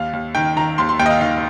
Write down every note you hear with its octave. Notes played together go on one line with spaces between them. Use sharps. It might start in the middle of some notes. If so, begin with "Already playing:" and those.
Already playing: D#2 F5
D#2
D#3 G5
D#3 A#5
D#2 C6
C6
D#2 G5
D#5
F5
D#3 F5